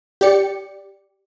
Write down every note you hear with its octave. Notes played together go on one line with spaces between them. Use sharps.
G4 D5 C#7